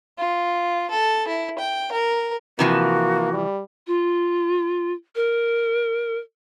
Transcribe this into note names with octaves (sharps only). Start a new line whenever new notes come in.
F4
A4
E4
G5
A#4
C3 E3 F3 A#3 F#4
G3
F4
A#4